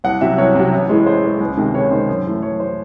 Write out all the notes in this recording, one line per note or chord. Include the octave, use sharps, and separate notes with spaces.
C2 F#5
C3 F#3 E5
C2 C#5
C3 F#3
A1
A2 E3 G#3
A1 C5
A2 E3 G#3
C#2
C3 D#3 G#3
C#2 C#5
C3 D#3 G#3 C5
F#2
E3 A3
F#2 C#5
E3 A3 C5